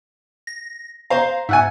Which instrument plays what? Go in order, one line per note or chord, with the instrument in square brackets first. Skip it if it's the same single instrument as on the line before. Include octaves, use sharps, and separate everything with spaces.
[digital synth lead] A#6
[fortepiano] C5 A#5 [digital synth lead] F5
[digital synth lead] G#2 [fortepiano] E5 F#5 G#5